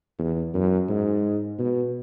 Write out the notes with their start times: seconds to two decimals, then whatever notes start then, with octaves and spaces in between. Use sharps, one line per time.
0.18 E2
0.54 F#2
0.89 G#2
1.59 B2